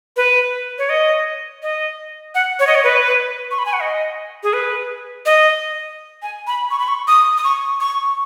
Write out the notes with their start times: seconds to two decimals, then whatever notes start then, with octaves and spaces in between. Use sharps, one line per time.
0.17 B4
0.78 C#5
0.89 D#5
1.63 D#5
2.35 F#5
2.59 C#5
2.67 D#5
2.75 C#5
2.84 B4
3.51 C#6
3.59 B5
3.66 G#5
3.73 F#5
3.80 D#5
4.43 G#4
4.53 B4
5.26 D#5
6.22 G#5
6.47 B5
6.71 C#6
6.80 B5
6.88 C#6
7.08 D#6
7.37 D#6
7.44 C#6
7.80 C#6